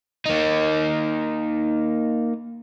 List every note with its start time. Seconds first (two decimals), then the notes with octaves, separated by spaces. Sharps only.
0.26 A#3 D#4